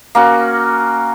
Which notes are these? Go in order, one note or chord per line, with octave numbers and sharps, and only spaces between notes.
A#3 C#4 F#4